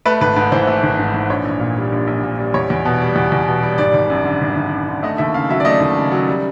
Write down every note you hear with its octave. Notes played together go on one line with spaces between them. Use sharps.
A3 B4
G#1 B4
G#2 B4
E3 C5
A3
G#1
G#2
E3
A#1 C#5
A#1
A#2
G3
A#1
A#1
A#2
G3
E2 C#5
E2
B2
G3
E2
E2
B2
G3
G#1 D5
G#1
F#2
D3
G#1
G#1
F#2
D3
A3 D#5
D#2 E5
C#3 F5
F#3 E5
D5
A3 D#5
D#2
C#3
F#3
G3